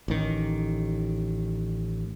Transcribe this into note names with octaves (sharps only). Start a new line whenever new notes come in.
A1 D#3